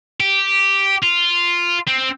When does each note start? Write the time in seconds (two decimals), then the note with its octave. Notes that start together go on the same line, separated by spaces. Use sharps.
0.20 G4
1.03 F4
1.87 C4